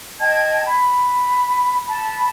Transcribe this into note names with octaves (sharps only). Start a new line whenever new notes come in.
D#5 G5 A5 G#6
B5
A5 B5